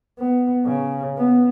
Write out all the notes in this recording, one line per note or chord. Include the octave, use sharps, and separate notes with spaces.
B3
C#3
B3